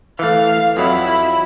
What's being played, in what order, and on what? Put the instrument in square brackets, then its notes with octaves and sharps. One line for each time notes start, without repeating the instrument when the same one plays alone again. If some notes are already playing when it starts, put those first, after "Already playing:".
[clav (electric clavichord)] E3 A3 [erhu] F5
[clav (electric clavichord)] F2 F#3 [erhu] E4